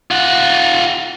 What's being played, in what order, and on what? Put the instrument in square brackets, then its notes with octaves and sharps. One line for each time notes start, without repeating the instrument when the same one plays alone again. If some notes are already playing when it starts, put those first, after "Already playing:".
[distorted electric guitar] F4 F#5